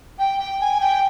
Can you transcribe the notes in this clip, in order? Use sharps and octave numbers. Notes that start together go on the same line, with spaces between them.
G5
G5
G#5
G5